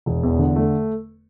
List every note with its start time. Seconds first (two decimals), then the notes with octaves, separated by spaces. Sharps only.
0.06 E1
0.23 E2
0.39 D3
0.56 A3